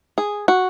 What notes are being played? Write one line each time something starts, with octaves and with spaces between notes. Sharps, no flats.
G#4
F#4